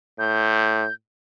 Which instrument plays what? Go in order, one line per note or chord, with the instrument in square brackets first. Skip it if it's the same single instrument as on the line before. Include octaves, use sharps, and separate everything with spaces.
[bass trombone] A2 [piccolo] G6